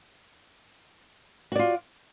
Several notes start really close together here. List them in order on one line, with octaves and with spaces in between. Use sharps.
F#4 D5 F4